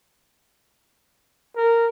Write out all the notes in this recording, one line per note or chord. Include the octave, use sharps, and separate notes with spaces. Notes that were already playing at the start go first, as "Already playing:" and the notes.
A#4